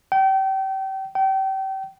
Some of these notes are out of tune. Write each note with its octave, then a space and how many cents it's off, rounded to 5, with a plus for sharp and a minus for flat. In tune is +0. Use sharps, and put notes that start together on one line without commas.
G5 -30
G5 -30